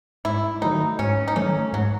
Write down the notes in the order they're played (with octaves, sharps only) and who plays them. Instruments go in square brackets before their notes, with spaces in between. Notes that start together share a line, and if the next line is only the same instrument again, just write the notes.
[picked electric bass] G#2 [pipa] E4
[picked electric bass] D#3 F#3 A3 [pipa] D#4
[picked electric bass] G#2 [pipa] C#4
[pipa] D#4
[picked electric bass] D#3 F#3 A3 [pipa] C#4
[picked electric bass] G#2 [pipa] F#3